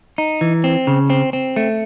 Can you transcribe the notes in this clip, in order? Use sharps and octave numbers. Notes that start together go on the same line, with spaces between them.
D#4
E3
C4
C#3
C4
C4
A3